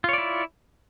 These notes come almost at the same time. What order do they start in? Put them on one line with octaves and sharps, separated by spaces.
F4 C#5 D5 E4